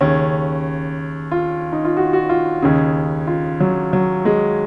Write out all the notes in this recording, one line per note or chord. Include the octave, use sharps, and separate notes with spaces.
D#2 C#3 C#4
F4
D#4
F4
F#4
F#4
F4
D#2 C#3
F4
F#3
F#3
G#3